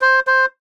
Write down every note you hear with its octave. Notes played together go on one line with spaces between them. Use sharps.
C5
C5